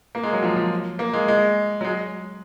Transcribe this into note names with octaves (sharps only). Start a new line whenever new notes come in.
A#3
G#3
F#3
F3
F3
A#3
G#3
G#3
F#3
G#3